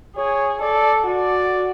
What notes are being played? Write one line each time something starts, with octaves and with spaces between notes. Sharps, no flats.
G#4 C#5
A4 D5
F#4 D5